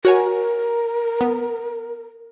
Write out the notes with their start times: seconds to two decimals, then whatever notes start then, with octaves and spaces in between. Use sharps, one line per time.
0.05 F#4 A#4 C#5 G#5
1.21 B3